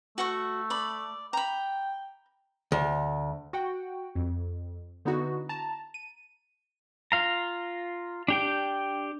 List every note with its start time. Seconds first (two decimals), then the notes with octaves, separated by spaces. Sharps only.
0.18 A3 F#4 F#5 C#6
0.70 D5 B5
1.33 G5 A#5 B5
2.72 D2
3.53 F#4 F#5 G5
4.15 F2
5.05 D3 B3 D#4 E4 F#4
5.49 A5 A#5 A6
5.94 D#7
7.12 F4 F5 A#5
8.28 D4 G4 G5